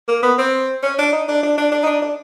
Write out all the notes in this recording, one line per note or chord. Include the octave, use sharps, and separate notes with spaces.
A#3
B3
C4
C#4
D4
D#4
D4
D4
D4
D4
D#4
D4
D4